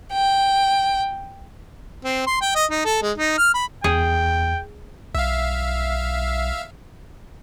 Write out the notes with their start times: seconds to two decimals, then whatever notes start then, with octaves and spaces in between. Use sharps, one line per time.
0.12 G5
2.04 C4
2.27 C6
2.41 G5
2.55 D#5
2.71 D#4
2.85 A4
3.02 G#3
3.18 D#4
3.38 F6
3.54 B5
3.84 E2 G#4 G5
5.15 B1 E5 F5